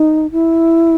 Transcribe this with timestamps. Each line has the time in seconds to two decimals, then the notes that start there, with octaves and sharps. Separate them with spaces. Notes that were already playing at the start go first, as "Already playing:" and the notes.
Already playing: D#4
0.32 E4